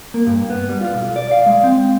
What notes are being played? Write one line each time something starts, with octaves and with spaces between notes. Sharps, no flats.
A#3
G2
B3
G3
F4
B1
D5
F5
G#3
C4